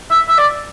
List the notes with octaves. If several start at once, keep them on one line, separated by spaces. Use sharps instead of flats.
E5
E5
D5